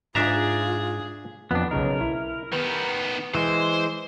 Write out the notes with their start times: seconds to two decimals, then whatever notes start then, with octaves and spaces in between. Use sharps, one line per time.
0.15 G#2 D4 F4 G#4 E5 A#5
1.51 F2 B3 D4
1.71 B1 C#3 D#4 A#4
2.01 E4
2.53 D#3 B3 B4
3.35 E3 G#3 C5